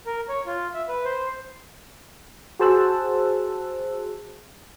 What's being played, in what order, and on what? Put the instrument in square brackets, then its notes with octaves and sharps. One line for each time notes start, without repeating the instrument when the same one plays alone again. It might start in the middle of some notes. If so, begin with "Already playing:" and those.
[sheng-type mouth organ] A#4
C#5
F4
E5
B4
C5
[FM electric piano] F#4 G#4 C5 A5 E6 F#6